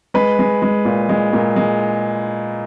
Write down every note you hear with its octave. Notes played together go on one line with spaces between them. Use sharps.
G#3 B4
G#3
G#3
A#2
G#3
A#2
G#3